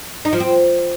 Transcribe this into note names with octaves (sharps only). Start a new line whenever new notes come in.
D#4
F3
C4